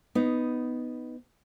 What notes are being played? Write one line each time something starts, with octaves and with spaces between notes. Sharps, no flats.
B3 D#4